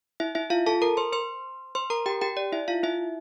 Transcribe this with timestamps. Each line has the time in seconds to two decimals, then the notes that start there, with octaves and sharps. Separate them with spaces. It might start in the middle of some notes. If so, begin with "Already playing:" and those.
0.20 E4 E5
0.35 E4 E5
0.50 F4 F5
0.66 A4 A5
0.82 A#4 A#5
0.97 C5 C6
1.12 C5 C6
1.75 C5 C6
1.90 A#4 A#5
2.06 G4 G5
2.21 G4 G5
2.37 D5
2.52 E4 E5
2.68 F4 F5
2.83 E4 E5